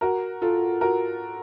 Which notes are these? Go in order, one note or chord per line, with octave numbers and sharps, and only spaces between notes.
F#4 A#4
F4 A4
F#4 A#4